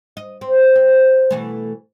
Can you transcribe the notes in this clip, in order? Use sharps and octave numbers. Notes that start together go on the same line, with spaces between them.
D#5
C4
C4
B2 E3 A3